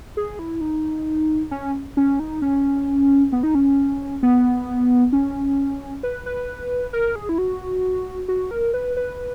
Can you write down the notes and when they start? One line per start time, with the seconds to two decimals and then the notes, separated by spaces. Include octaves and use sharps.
0.17 G#4
0.39 E4
0.61 D#4
1.51 C#4
1.97 C#4
2.20 D#4
2.42 C#4
3.32 B3
3.43 D#4
3.55 C#4
4.23 B3
5.13 C#4
6.03 B4
6.26 B4
6.93 A#4
7.16 G#4
7.29 E4
7.38 F#4
8.28 F#4
8.51 A#4
8.74 B4
8.97 B4